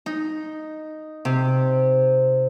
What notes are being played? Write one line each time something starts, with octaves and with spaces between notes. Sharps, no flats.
D#4
C3